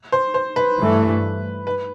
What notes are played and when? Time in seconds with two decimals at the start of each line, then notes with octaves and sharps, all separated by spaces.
0.12 C5
0.34 C5
0.56 B4
0.79 G2 E3 A3
1.67 B4